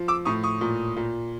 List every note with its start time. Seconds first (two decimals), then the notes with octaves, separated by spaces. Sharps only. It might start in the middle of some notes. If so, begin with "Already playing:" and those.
Already playing: F3
0.08 D6 E6
0.25 A2 C#6 D#6
0.43 C#6 D#6
0.61 A#2
0.96 A#2